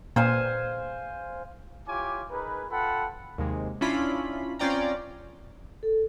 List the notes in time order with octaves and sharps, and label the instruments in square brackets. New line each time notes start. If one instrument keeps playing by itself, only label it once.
[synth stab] A#2 [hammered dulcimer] C5 F5 G#5
[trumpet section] E4 F4 G4 C#5 G#5 D6
D#4 G#4 A#4 B4
F4 A4 F#5 G5 A5 B5
[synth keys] D#2 C3 G#3
C#4 D4 E4 F4 B5
C4 C#4 F4 D5 G5 A#5
[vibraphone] A4